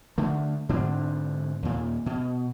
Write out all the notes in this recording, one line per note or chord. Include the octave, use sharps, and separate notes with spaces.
D3 A3
G#2 D3 C4 D4
D#2 A#2
B2